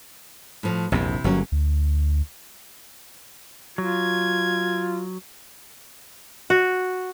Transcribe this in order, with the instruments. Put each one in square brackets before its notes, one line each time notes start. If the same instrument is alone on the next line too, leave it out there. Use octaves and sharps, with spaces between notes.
[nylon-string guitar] A2 F3
[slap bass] A#1 E2 G2 [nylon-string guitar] C3 E4
[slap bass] G1 [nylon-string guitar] F#3 A#3 C#4
[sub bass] D2
[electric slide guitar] F#3 [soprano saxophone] F4 [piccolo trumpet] G#6
[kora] F#4